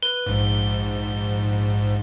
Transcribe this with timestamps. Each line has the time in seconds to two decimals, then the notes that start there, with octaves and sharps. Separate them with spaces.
0.03 B4 G7
0.26 A#1 G#2